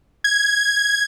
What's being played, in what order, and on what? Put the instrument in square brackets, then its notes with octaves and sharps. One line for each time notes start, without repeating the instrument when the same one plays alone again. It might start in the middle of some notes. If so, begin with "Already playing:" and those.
[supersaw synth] G#6